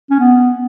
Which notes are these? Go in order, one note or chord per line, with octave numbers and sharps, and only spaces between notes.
C#4
B3